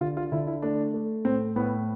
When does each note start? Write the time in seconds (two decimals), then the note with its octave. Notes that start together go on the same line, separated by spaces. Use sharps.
0.01 D3 F4
0.17 F4
0.32 D3 E4
0.47 E4
0.62 A3 D4
0.94 A3
1.25 A2 C4
1.56 A2 B3